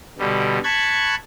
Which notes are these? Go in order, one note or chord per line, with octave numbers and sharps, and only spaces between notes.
B2 D3 G3
A5 B5 C#6 F#6 G#6